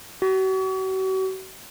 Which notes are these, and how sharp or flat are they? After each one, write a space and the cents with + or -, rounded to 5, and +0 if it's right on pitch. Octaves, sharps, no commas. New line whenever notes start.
F#4 +40